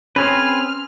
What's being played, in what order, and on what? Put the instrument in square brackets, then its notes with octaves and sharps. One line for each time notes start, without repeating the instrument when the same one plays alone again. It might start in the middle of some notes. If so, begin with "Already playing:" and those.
[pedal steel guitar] C4 G#4 B4 [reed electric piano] C#4 [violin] F6